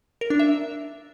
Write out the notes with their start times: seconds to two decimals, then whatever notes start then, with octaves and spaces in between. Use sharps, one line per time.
0.21 A#4
0.30 D4
0.39 E5